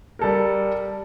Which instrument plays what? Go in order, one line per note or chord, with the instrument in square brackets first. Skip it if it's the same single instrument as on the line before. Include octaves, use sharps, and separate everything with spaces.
[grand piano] G3 A4 A#4